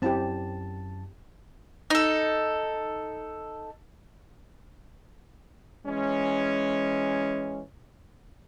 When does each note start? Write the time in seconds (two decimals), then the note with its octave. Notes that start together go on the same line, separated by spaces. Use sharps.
0.02 F#2 C4 E4 G4 A5
1.90 D#4 A4
5.86 E3 G#3 C#4